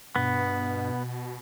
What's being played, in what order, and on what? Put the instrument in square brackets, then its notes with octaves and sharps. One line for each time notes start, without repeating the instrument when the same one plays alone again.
[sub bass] G2 [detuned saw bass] B2 [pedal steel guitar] B3